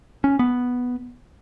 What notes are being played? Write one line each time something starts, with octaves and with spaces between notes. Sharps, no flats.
C#4
B3